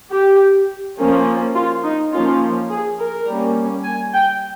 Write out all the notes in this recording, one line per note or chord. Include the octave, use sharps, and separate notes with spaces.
G4
F3 A#3 C#4
F4
D#4
F3 A#3 C#4 F4
G#4
A#4
G3 A#3 C#4
G#5
G5